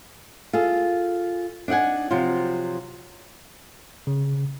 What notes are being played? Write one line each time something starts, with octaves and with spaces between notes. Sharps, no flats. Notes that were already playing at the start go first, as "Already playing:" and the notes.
F4 G#4 A4
D4 D#4 F5 F#5 G#5
C3 F3 F#3 F4
C#3